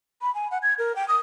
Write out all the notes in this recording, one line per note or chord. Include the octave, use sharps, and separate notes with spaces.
B5
G#5
F#5
G#6
A#4
G5
D#6